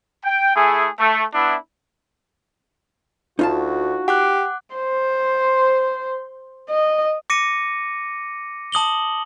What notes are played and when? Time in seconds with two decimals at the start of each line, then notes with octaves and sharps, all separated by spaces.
0.25 G5
0.56 A3 E4 G#4
1.00 A3
1.34 B3 D4 E4
3.39 D2 D#4 F4 F#4 A5
4.08 G4 F#5 D6 F#6
4.76 C5
6.69 D#5
7.30 D6 A#6 C#7 D#7
8.72 A5 D#6 F#7 G7